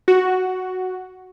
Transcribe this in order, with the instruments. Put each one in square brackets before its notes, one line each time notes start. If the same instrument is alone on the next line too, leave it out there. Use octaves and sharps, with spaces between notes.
[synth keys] F#4